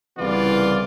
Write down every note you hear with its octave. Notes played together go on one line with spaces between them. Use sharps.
C2 C#3 E3 B3 F4 D5